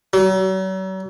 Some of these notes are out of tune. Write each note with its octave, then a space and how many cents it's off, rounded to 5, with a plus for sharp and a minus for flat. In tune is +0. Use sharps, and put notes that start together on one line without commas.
F#3 +40